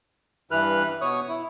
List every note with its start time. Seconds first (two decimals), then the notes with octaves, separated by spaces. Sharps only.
0.51 G2 E3 B4 F6 F#6
1.01 B2 C#5 C#6 D#6
1.29 E4